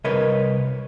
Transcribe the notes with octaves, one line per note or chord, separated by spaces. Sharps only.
C2 A#4 B4 C#5 D#5